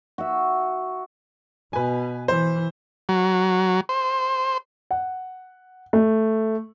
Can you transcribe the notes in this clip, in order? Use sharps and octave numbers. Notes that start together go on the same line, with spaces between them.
F#4 E5
B2 B4 G#5
E3 C5
F#3
C5
F#5
A3